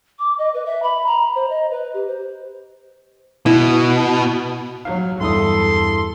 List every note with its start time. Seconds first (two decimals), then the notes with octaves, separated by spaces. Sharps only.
0.19 D6
0.38 D#5
0.54 B4
0.66 E5
0.82 B5
1.06 A#5
1.35 C5
1.49 D#5
1.70 B4
1.94 G4
2.07 C5
3.46 B2 E4
4.85 F#3 F5
5.21 E2 G2 E4 A4 C6 D#6